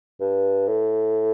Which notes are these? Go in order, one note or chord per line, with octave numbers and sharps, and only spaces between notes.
G2
A2